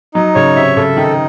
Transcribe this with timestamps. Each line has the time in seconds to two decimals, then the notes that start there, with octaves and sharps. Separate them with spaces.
0.15 F#3 D#4
0.35 C#3 C#5
0.56 C3 E5
0.76 C#3 A4
0.97 D#3 D#4